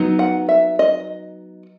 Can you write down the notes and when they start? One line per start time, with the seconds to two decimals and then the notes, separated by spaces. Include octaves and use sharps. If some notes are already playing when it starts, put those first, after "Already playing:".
Already playing: F#3 B3 D#4
0.19 F#5
0.49 E5
0.79 D#5